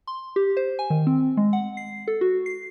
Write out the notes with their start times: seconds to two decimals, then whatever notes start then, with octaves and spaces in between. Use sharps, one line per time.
0.07 C6
0.36 G4
0.57 C5
0.79 G#5
0.90 D#3
1.07 C4
1.37 G#3
1.53 F#5
1.77 C7
2.08 A4
2.21 F#4
2.46 C7